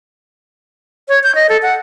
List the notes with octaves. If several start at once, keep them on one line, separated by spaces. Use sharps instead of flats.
C#5
G6
D#5
A4
F#5